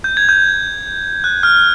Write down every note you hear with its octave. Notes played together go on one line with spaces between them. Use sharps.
G6
G#6
G6
F#6
F6